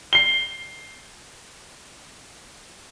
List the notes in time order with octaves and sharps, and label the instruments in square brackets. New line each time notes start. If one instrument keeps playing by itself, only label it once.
[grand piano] C7 G7